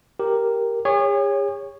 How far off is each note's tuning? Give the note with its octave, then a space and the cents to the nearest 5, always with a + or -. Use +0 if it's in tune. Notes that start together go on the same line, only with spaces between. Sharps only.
G4 +0 A#4 +0
G#4 -45 C#5 +0